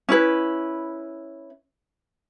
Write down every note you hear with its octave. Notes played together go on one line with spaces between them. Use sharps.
C#4 E4 B4